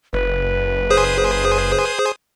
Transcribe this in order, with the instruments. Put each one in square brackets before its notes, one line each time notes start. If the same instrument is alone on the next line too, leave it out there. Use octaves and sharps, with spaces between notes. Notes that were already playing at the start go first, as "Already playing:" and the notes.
[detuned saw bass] F#1 [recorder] B4
[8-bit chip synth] G#4 C5 D#6